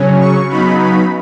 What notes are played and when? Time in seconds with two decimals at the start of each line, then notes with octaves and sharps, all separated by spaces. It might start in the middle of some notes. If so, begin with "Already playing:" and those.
Already playing: C#3 F#3 C#4
0.20 C#6
0.49 C#3 F#3 B3 D#4 B5
0.80 B5